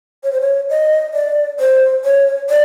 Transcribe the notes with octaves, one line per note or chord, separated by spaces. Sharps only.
C#5
C5
C#5
D#5
D5
C5
C#5
D5